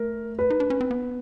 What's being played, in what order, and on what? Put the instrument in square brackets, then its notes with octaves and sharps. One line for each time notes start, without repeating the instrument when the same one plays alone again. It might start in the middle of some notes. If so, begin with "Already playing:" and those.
Already playing: [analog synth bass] A3 [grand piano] A#4
[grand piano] B4
[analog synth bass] D#4
D4
C#4
C4
B3